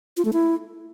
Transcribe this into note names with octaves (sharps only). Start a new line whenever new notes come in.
F4
A3
E4